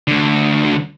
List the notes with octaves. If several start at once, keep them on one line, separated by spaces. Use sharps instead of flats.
D2 D3